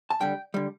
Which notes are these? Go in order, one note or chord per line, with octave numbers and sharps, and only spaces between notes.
A5
G2 D3 G3 G5
D3 G3